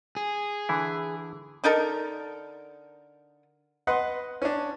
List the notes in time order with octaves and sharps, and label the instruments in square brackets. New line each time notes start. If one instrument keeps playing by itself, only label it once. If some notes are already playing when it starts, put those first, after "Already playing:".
[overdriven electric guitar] G#4
[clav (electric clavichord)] D3 E3 E4
[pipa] D3 D#4 A4 A#4
[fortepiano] B4 D#5 F#5 C6
C#4 D4